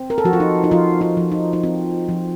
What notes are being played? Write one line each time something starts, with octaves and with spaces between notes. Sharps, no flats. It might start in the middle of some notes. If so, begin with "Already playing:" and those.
Already playing: C4
A#4
A4
F3 F#4
F4
D#4
D#4
F3 F4
F4
F3
D#4
D#4
C4 F4
F3